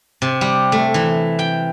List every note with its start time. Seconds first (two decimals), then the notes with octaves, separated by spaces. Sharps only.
0.22 C3
0.41 G3
0.72 A3
0.94 E3
1.39 G5